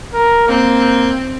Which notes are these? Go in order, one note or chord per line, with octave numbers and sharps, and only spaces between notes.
A#4
A#3 C4